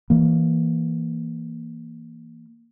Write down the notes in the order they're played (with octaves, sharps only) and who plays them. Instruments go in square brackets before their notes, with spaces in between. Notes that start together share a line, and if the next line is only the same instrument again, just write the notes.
[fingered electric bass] E3 A#3